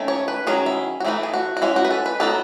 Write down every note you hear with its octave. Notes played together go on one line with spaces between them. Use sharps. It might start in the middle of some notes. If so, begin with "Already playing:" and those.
Already playing: D#3 A3 C#4
C#5
B4
D#3 F#3 C#4 G#4
E4
F#4
E3 A3 D#4 E4
G#4
F#4
F#4
G#3 C#4 E4
F#4
B4
A4
B4
F#3 B3 D#4 A4